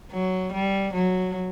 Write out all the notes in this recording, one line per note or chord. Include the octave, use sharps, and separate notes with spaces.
F#3
G3
F#3